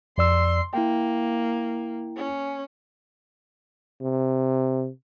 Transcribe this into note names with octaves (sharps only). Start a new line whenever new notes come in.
F2 D5 C6 E6
A#3 E4 G5
C#4
C3